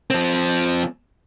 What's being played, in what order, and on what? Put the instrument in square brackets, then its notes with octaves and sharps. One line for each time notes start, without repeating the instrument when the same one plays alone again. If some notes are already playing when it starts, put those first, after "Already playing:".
[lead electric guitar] F3 C4